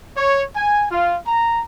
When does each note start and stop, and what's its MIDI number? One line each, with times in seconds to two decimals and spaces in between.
0.16 0.44 73
0.56 0.86 80
0.92 1.16 65
1.27 1.62 82